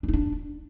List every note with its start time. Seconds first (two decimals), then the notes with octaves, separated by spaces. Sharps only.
0.03 D4
0.08 D#4
0.13 D4